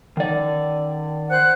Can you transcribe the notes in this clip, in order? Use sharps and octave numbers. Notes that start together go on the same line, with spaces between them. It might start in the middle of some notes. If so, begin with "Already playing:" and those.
D#3 D5
C5 F#5 F#6